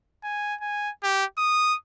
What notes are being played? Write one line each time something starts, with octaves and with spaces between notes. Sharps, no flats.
G#5
G#5
G4
D#6